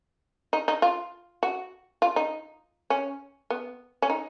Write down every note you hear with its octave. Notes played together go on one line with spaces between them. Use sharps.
D#4
D#4
F4
F#4
F4
D#4
C#4
B3
C#4
D#4